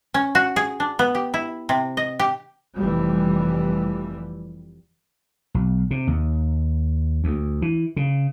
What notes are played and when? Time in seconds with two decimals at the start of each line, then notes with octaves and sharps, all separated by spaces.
0.14 C#4
0.35 F#4
0.56 G#4
0.80 D4
0.99 B3
1.15 G4
1.34 E4
1.69 C3
1.97 D#5
2.19 G4
2.76 F1 E3 G3
5.54 B1
5.91 C3
6.07 D#2
7.24 D2
7.62 E3
7.96 C#3